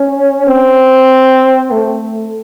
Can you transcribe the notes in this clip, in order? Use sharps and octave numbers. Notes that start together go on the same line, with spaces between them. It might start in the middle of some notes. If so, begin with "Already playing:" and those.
Already playing: C#4
C4
A3